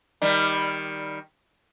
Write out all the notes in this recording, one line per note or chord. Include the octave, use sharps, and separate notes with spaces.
D#3 G3